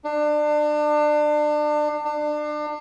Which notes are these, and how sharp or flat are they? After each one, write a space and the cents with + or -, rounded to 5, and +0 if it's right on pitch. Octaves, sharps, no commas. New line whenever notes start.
D4 +30
D4 +30